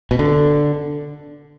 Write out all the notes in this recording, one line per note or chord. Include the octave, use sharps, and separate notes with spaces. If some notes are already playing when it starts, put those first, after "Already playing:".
B2
D3